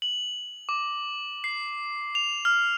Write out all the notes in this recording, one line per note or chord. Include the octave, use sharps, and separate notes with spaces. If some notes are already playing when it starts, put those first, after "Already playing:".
F#7
D6
C7
F7
F6